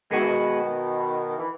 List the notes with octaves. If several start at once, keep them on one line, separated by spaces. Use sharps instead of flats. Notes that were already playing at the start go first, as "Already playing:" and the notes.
D#3 G#3 B3 F#4
E3
B2 D#3
E3